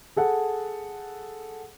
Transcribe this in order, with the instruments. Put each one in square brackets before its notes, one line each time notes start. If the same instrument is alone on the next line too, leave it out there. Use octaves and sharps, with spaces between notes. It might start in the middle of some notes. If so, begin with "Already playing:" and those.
[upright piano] G#4 A4 F#5